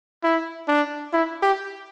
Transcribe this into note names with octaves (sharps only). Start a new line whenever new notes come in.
E4
D4
E4
G4